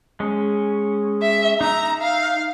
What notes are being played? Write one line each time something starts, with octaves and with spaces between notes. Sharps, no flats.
G#3 C#4
E5
D#4 E5 A#5
F5